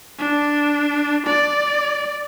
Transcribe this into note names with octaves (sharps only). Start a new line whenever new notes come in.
D4
D5